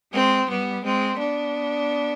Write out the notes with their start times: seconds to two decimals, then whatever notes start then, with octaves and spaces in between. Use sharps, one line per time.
0.13 G#3 C4
0.49 G3 B3
0.84 G#3 C4
1.19 B3 D4